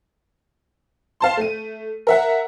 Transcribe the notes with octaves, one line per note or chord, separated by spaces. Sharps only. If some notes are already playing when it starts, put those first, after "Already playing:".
F5 A5 C6
A3 D#7
A#4 E5 F#5